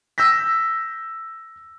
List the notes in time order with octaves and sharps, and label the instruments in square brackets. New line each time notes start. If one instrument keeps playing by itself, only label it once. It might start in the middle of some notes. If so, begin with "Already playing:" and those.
[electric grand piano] E6 G6 A#6 B6